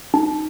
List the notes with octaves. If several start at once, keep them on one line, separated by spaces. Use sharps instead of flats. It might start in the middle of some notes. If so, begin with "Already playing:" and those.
D#4